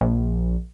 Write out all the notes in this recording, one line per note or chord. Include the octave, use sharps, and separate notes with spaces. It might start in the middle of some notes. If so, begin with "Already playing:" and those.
A#1